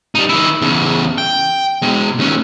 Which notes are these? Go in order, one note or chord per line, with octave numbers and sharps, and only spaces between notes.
G3 D#4
D#3 E4
E2 C#3
G5
B2 G#3
D#2 C#4